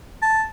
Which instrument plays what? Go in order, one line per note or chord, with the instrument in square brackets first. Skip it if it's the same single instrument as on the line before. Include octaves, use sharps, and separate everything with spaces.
[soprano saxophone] A5